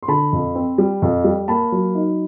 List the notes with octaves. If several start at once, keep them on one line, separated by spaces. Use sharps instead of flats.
C6
D3 A5 B5
F2
C4
G3
F2
G3
A#3 A5 B5
F#3
D#4